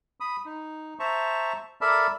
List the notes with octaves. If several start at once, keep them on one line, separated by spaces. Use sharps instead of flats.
B5 D#6
D#4
C5 E5 A5 A#5 C#6
A4 A#4 D5 E5 A5 B5